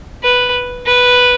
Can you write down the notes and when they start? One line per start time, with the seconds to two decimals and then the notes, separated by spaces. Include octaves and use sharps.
0.23 B4
0.86 B4